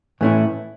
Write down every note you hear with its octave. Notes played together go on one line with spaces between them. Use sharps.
A2 E3 A3 C#4 E4